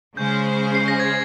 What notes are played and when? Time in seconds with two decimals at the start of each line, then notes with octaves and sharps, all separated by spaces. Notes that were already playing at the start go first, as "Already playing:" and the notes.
0.16 C#3 G#3 C#4 G#4 C5 G6
0.75 C7
0.88 A#6
1.00 G#6